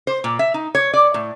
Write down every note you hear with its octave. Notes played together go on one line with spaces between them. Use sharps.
C5
A#2
E5
D#4
C#5
D5
A2